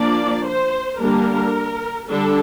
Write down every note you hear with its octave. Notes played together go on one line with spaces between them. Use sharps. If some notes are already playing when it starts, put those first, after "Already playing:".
Already playing: F3 A#3 D4 D5
C5
D3 G3 A#3 D4 A#4
D3 G3 D4 A4